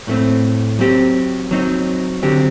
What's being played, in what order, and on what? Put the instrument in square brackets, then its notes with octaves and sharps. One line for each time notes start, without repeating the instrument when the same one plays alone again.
[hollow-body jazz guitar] A2 A3 C4
F#3 C4 G4
F#3 C4 D#4
D3 F#3 C4 G4